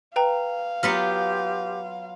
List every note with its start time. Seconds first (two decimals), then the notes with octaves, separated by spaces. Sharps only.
0.16 B4 F5 G5 A#5
0.83 F#3 B3 F4 G4 F6 B6 C#7